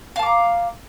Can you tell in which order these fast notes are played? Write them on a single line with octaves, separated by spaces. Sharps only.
F5 A5 D6 A#5